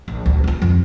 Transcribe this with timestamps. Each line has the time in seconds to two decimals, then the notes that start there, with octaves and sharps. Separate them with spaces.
0.08 A#1
0.26 D2
0.44 B3 F4
0.62 F2